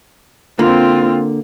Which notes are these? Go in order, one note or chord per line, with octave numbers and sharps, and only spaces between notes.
D3 A#3 C4 F4